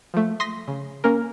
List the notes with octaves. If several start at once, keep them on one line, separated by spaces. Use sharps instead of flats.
F3 A3
C6 D#6 A#6 B6
C#3
A#3 C#4 A#4